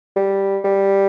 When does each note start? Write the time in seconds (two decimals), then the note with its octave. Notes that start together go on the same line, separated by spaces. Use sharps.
0.16 G3
0.64 G3